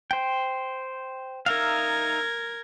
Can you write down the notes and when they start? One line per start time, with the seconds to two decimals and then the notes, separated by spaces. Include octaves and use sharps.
0.11 C5 G5
1.46 D#4 A#4 E5 F5 G#6